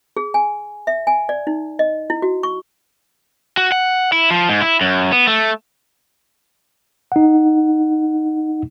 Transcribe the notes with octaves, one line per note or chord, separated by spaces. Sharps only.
G#4
G#5
E5
G#5
D5
D#4
D#5
E4
F#4
C#6
F#4
F#5
E4
F3
G#2
E4
F#2
B3
A3
D#4 F#5